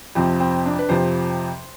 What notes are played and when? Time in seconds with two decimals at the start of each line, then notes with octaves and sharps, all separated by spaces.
0.15 F2 C3 F3 C4
0.40 C4
0.66 D4
0.79 B4
0.89 F2 C3 F3 C5